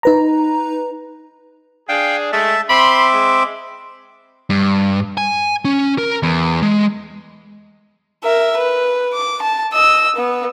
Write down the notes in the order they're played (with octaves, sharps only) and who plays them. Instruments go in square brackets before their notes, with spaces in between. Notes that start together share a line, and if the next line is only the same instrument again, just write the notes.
[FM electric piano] D#4 B4 A#5
[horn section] D4 G#4 [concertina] F5 G5
[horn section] G#3 A3 [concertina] E5 A5
[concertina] C4 E5 D6 [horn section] B5 C6
[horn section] G#3
[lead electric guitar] G2
G#5
C#4
A#4
E2
G#3
[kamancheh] A#4 E5
B4
D6
A5
D#5 E6
B3